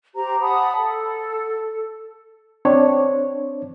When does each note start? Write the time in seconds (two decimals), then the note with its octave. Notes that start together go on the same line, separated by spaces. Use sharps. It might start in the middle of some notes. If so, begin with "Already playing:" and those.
0.15 G4 C5 A#5
0.41 F#5 A5 B5 D#6
0.76 A4
2.65 C4 D4 C#5